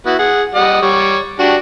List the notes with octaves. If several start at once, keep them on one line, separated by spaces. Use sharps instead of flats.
B3 E4 F#4
G#4 F#5
G3 D#5 F#5
G3 C#5
D4 F#4 G4